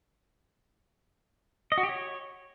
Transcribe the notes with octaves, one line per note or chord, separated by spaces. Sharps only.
D#5
F#4
G4
C#5